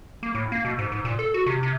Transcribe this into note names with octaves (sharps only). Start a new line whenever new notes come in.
A#3
A2
A#3
B2
G#2
G#2
A#2
A4
F#4
C3
C3